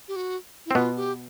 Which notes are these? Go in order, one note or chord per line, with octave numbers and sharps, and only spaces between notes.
G4
F#4
E4
C4
B2 B3 F4
G4